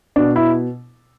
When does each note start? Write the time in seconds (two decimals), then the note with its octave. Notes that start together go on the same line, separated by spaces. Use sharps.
0.16 B2 D4
0.36 E4